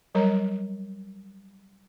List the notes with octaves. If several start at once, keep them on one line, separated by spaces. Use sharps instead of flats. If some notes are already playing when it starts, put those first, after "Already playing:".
F#3 G3 A#4 C#5 A#5